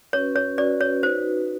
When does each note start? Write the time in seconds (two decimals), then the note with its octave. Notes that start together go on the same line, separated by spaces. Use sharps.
0.13 C#4 F#4 B4 C#5
0.36 C#5
0.58 C#4 F#4 B4 D5
0.81 C#5
1.03 D#4 F#4 B4 C5